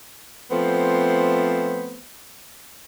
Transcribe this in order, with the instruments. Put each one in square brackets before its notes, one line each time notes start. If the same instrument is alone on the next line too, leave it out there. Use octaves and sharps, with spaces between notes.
[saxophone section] F3 A3 B3 C4 C5